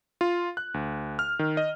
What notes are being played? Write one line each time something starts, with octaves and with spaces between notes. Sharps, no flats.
F4
F#6
D2
F6
D#3
D#5